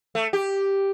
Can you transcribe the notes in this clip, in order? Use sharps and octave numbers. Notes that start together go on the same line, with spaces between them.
A3
G4